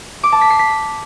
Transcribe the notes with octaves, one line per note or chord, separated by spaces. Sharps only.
D6
A5
B6
C7
B6